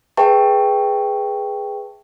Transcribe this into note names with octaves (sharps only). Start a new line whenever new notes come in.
G#4 B4 E5 G5 A5 C#6